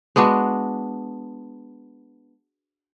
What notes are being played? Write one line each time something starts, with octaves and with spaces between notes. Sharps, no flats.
G#3 B3 D4 F#4